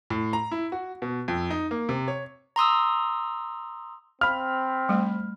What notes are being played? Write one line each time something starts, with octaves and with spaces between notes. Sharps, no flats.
A2
A#5
E4
F#4
B2
F2
D#4
A#3
C3
C#5
A#5 C6 D#6 E6
C4 F5 B5 F6
G3 A3